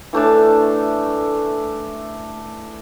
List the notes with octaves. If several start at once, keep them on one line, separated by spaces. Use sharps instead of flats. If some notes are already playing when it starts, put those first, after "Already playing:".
E3 A3 D4 A5